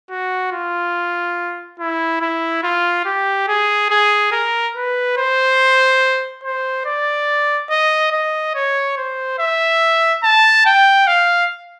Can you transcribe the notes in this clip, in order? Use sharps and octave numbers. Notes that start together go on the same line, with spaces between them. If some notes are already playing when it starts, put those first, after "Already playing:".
F#4
F4
E4
E4
F4
G4
G#4
G#4
A#4
B4
C5
C5
D5
D#5
D#5
C#5
C5
E5
A5
G5
F5